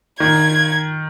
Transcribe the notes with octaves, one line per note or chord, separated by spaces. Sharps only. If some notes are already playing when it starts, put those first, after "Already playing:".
D#3 G#6